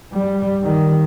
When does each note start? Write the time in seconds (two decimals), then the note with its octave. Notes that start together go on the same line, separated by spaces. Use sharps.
0.13 G3
0.62 D#3